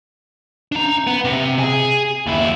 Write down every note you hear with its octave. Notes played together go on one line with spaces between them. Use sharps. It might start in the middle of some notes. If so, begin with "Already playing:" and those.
D4 A#5
B3
C3
G#4
D#2 E4